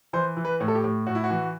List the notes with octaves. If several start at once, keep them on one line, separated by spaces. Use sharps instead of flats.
E3 C5
E3
B4
A2
A4
G4
A2
A2 F#4
E4
F#4
E3